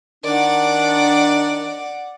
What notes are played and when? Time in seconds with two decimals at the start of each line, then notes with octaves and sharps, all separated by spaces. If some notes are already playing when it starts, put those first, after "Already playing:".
0.25 D#3 D4 D5 F#5